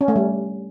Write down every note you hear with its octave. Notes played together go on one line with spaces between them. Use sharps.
C#4
A3
G3